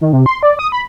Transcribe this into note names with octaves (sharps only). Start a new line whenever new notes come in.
D#3
C3
C6
D5
D#6
B5